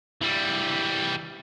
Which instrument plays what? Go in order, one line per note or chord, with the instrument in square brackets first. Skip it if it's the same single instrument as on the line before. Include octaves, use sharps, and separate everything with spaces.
[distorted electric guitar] E3 G3